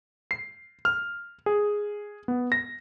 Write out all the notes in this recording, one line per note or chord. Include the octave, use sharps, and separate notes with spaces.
C7
F6
G#4
B3
A#6